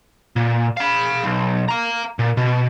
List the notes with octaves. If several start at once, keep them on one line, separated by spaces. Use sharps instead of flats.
A#2
F5 B5
B1
F5 A#5
A#2
B2